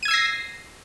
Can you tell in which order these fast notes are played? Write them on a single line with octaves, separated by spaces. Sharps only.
D#7 G#6 E6 C7 A#6